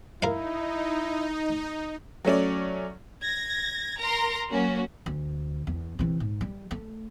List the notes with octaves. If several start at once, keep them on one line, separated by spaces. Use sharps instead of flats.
D#4 E4 A#4 F5
F#3 A3 C#4 D5
G#6 A#6
A#4 A#5 C6
F#3 A#3 C#4 F#4
D2
E2
C3 E3
G#2
G3
A3